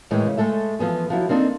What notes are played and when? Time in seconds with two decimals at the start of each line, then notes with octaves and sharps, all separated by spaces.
0.11 A2 D#3 E3 G#3 E4
0.26 C#3
0.37 G#3 A3 A4 E5
0.79 E3 F3 B3 G#4
1.10 F3 F#3 E4
1.29 A#3 C4 D4 D#4 A4